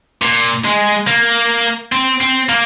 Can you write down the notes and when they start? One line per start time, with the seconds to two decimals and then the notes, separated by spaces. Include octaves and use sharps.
0.22 A#2
0.64 G#3
1.07 A#3
1.92 C4
2.21 C4
2.49 A#3